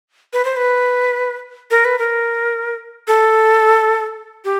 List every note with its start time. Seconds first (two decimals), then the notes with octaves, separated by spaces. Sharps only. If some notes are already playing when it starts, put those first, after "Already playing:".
0.33 B4
0.45 C5
0.56 B4
1.71 A#4
1.85 B4
1.99 A#4
3.08 A4
4.45 G4